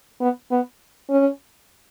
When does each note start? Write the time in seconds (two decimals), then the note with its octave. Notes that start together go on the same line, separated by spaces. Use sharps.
0.21 B3
0.51 B3
1.10 C#4